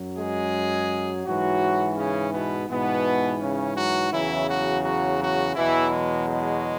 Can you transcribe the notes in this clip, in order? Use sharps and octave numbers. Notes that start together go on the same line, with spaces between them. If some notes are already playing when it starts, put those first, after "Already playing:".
Already playing: F#2 F#3
G#3 G#4
G#2 E3 F#3 F#4
C#3 C#4
B2 B3
G#2 B2 E3 B3
C#3 C#4
F#3 F#4
E2 C#3 E3 F#3 E4
F#3 F#4
F#3 F#4
F#3 F#4
E2 B2 E3 F#3 E4
G#3
G#3